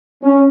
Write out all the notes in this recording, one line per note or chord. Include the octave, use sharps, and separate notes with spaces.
C#4